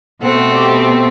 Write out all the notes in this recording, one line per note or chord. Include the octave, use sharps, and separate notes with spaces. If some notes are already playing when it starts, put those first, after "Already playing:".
B2 A3 C4 F#5
G4